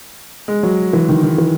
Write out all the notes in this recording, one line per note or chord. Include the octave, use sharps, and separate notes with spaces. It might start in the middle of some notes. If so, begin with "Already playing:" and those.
G#3
F#3
E3
D#3
D#3
E3